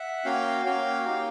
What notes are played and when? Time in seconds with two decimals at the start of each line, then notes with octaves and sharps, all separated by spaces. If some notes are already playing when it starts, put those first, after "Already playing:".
Already playing: E5 F#5
0.25 A#3 C#4 F#4 F5 G5
0.65 A#3 C#4 F#4 F5 G5
1.06 A#3 D#4 G4